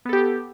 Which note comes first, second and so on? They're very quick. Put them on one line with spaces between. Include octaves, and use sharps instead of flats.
B3 A4 G4